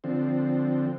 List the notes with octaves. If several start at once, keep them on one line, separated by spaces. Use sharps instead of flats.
D3 F3 C4